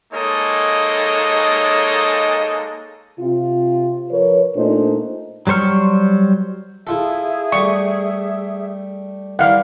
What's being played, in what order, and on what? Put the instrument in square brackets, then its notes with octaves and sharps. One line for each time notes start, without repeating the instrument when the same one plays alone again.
[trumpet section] G#3 A#3 D#4 A4 C#5 D#5
[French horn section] C3 F4
F3 A#4 B4 C#5
A#2 A3 D4 D#4 C5
[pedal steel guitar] F#3 G3 C5 C#6 F6
[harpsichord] E4 F4 A4 [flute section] G#4 E5
[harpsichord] G3 A3 [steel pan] C#6
[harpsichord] E3 G3 [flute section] E4 [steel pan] F5 F#5